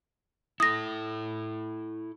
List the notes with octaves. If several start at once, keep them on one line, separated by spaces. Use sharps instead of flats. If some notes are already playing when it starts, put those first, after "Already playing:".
E4 A4 D#6 A#6